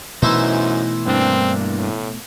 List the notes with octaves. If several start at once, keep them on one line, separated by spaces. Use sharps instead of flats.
F#2 B2 E3 A3 D#4 E4 C5
G2 A#3 C4 D4
A2